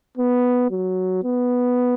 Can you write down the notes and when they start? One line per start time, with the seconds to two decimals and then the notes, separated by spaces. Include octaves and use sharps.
0.17 B3
0.71 F#3
1.24 B3